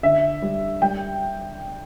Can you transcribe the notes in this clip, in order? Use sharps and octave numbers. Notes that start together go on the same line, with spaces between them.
D3 E5
G3
G3 G5